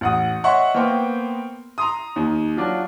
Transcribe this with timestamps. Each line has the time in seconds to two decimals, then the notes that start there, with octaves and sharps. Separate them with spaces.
0.01 A1 F#5 D#6
0.44 C#5 D#5 E5 F#5 C6 C#6
0.74 A#3 B3 C5 G5 C6 C#6
1.78 A#5 C6 D#6
2.16 D#2
2.57 F#3 D4 F4